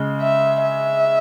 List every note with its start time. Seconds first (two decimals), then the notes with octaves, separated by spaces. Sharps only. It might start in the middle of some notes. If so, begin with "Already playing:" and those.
Already playing: C#3 G#3
0.21 E5
0.63 E5